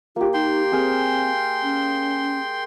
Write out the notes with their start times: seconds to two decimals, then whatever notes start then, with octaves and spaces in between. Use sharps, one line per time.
0.16 A#3 F4 G4
0.34 D#4 G5 C6
0.72 C4 G#4 A#4
1.63 C#4